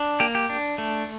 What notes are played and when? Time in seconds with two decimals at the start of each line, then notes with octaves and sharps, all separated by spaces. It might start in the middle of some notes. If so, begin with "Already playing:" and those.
Already playing: D4
0.20 A#3 G4
0.35 G4
0.49 D4
0.78 A3